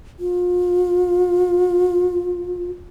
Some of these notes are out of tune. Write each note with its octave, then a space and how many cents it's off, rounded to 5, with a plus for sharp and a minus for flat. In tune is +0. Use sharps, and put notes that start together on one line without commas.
F4 +35